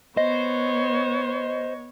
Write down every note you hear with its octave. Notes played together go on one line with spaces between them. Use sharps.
B3 C5 C#5 D#5